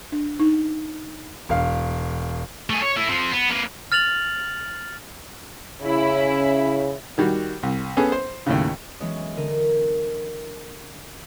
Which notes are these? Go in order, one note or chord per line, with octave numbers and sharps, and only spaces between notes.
D4
D#4
E1 F5
A3 G#4
C#5
A3 E4
F3 C4
B3
A#3 B4
F6 A6 F7 F#7
C#3 C#4 E4
D#3 G3 F#4
C2
B3 C#4 G#4 A4
C5
D#2 A2 C#3
E3 F#3 G#3 B3 C#4
D3 A#4 D#7